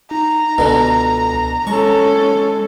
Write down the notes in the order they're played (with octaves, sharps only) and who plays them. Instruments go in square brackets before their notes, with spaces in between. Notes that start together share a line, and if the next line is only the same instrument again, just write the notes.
[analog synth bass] D#4 [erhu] A#5
[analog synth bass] C#2 [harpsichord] B2 D3
[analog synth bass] G#3 [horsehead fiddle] C#4 A4 [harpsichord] C#6